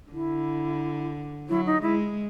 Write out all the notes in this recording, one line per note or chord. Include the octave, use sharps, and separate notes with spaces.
D3 E4
F#3 E4
D#4
G#3 E4